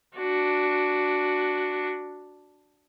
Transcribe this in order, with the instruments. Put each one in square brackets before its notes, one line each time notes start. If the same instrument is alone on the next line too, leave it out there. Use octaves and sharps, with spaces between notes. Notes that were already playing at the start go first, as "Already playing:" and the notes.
[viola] D4 F#4